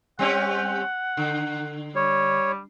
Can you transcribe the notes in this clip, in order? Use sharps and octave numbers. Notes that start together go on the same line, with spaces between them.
G3 C4 C#4 F#5
D3
G3 C#5